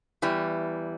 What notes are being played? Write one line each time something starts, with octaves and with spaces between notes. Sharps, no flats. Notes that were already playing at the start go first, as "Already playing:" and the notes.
E2 E3 G3